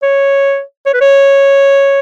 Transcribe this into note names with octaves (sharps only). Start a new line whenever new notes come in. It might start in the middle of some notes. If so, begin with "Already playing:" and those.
C#5
C#5
B4
C#5